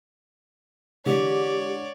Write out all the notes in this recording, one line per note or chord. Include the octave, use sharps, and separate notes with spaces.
D3 E3 G#3 G4 C#5 D5